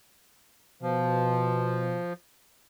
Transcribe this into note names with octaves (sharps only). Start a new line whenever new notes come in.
B2 F3